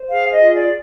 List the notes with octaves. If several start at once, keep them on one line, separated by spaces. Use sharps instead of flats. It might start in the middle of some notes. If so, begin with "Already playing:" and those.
Already playing: C5
G#4 F5
D#5
F4
D5